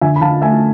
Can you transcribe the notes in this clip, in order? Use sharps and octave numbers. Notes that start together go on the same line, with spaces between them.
D3 E5 G#5
B5
D3 F5 A5
A3 E5 G#5